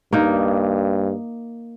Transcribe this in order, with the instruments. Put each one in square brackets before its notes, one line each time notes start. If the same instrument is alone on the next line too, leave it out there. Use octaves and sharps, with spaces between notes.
[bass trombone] G2 [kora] A#3 D#4